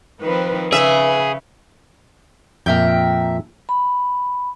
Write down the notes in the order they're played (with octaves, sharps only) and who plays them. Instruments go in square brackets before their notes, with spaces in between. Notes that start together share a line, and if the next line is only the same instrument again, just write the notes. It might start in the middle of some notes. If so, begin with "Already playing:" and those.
[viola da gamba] D#3 F3 C4 [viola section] B4
[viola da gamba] C#3 [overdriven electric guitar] G#4 [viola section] B4 [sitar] E5
[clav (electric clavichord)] F2 A#2 [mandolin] A#4 E5 G5
[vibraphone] B5